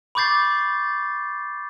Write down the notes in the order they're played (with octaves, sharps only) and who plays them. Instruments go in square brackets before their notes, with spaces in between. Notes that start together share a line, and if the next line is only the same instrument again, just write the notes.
[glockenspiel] B5 C#6 D6 G6 A6 C7